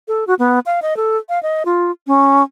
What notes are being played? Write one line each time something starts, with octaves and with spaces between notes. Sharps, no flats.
A4
F#4
B3
F5
D#5
A4
F5
D#5
F4
C#4